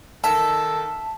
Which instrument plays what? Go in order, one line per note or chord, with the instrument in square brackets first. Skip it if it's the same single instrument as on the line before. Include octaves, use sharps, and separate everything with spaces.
[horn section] D#3 A4 [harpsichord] E5 [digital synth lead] A5